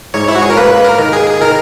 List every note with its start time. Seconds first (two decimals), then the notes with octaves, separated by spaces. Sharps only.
0.14 G#2 C#5
0.28 E4
0.35 F#4
0.42 G#4
0.50 A#4
0.57 A#3 B4
0.85 A#4
0.98 D#3
1.13 G#4
1.41 D#3 A#4